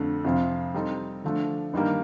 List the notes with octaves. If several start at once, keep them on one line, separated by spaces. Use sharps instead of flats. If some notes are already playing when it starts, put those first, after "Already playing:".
Already playing: F2 D3 A3
F2 C3 F3
G3 C4 D#4 A4
D3 F3 A3 D4
G2 D#3 G3 A#3